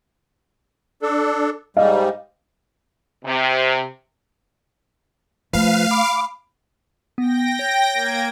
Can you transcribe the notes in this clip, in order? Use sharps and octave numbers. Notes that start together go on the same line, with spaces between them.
D4 A4
G#2 G3 D#5 F5
C3
F3 A3 B4 F5
B5 D6
B3 G5 A#6
C#5
A#3 G#6 D7